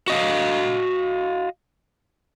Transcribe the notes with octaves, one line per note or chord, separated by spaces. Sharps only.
F#4 D#5 F5